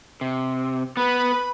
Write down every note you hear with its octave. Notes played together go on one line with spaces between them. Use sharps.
C3
B3 B4 B5